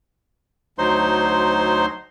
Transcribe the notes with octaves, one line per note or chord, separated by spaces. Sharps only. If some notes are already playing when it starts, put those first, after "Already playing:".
D2 F#3 D#4 C5 C6